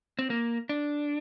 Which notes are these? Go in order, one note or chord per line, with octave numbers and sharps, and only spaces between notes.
C4
A#3
D4